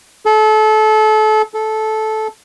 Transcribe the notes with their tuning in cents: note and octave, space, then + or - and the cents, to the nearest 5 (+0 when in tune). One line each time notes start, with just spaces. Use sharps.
A4 -30
A4 -15